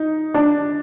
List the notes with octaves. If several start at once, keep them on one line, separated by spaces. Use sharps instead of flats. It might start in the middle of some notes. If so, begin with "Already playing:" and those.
Already playing: D#4
D4